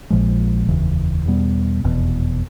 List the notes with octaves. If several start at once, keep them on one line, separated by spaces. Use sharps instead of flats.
A#1 A#2 F3 G#3
F1 D#2 C#3 E3
E2 B2 G3 B3
F1 E2 B2